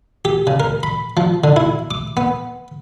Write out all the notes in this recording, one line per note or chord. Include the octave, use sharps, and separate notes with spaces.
G4
C#3
A#4
B5
F3
D3
E4
D6
B3